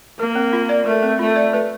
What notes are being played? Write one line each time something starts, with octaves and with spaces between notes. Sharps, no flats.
A#3 A#4
C4
F4
D5
A3 A#4
C4
A3 F4
D5
B4